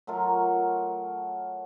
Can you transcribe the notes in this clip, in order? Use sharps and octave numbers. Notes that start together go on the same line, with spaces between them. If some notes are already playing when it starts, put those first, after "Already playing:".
F#3 A3 F4 A#4